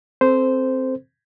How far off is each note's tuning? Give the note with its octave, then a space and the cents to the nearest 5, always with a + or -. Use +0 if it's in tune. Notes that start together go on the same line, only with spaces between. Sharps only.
C4 +5 A4 +0 C5 -10